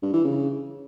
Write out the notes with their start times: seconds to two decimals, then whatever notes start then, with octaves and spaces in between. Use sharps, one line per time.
0.02 G2
0.13 E3
0.24 C#3